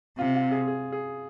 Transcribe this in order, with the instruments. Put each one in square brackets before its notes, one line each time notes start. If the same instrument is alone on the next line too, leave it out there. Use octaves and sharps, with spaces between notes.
[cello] C3 [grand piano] F4
[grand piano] F4
G#4
G#4
G#4